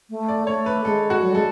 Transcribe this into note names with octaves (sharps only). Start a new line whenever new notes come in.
A3
D5
A3 C#5
B4
G#3 A4
F#4
F#3
G#3 A4